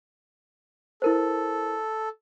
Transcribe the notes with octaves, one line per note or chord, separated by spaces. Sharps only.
E4 A4 A#4 C5